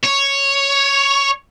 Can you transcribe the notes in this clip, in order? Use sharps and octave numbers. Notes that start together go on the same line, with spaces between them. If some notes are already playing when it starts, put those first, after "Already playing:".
C#5